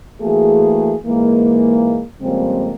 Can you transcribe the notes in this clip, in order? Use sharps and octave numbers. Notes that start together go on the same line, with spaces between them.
E3 A3 A#3 F#4 G#4
G#2 E3 G#3 A#3
F2 C#3 G3 G#3 A#3 C4